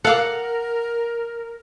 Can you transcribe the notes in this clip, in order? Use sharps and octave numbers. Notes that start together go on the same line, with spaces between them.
A4 A#4 F5 F#5 D6